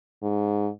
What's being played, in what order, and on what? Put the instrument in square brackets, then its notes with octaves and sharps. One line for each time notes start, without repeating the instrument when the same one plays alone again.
[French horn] G#2